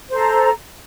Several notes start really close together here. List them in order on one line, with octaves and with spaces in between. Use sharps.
C5 A4 A#5